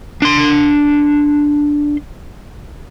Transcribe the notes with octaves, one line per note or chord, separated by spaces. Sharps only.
D4 C6